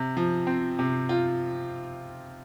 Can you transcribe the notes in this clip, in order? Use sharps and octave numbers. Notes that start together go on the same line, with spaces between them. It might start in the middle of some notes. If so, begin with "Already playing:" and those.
Already playing: C3
F3
C4
C3
F4